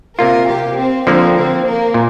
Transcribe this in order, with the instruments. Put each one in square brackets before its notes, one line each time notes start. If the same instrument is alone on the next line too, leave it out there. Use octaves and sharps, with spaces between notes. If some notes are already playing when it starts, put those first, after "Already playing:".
[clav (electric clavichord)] C3 A#3 F4 [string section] A#4
[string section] G4
C4
[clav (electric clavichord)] D3 F3 A#3 [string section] C4
[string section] C4
A#3
[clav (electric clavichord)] A#2